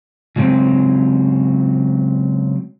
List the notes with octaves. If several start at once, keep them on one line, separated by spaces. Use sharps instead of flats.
C#3 F#3 G#3 C4